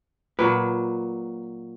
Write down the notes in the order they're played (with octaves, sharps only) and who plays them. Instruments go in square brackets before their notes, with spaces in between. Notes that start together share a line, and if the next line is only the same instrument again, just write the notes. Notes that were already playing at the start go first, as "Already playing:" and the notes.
[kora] A#2 F#3 [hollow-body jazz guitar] B4